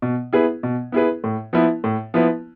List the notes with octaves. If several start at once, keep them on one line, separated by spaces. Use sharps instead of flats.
B2
B3 E4 G#4 B4
B2
B3 E4 G#4 B4
A2
F3 B3 E4 B4
A2
F3 B3 E4 B4